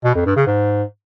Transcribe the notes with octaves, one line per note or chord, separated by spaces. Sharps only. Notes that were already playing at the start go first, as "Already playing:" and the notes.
B2
F2
G2
C#3
G#2